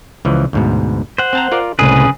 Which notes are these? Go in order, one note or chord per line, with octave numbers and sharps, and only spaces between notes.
C#2 E3 F3
D2 G#2 B2
C5 F#5
C4 A5 A#5
F4 A#4 D5
C2 A2 C#3 G#3 G#4 B4